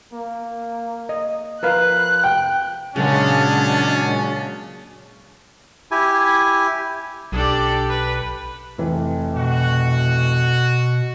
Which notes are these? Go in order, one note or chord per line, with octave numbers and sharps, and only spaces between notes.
A#3
D#5
F3 A#4 B4 F5 F#6
G5
A#2 C#3 F#3 G#3 C#4 D4
E4 G4 G#5
B1 D4 G4 A4 D5
B4
F1 E3
B2 F#4